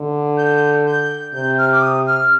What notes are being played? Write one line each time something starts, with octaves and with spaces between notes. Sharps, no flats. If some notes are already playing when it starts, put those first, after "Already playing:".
Already playing: D3
G6
G6
C3 G6
F6
D6
D#6
F6